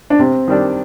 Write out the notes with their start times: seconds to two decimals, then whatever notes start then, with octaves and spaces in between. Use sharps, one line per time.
0.10 D4
0.19 C3 C4
0.48 D#3 G3 D4